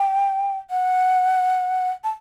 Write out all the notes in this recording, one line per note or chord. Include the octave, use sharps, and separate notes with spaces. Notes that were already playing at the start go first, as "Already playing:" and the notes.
Already playing: G5
F#5
A5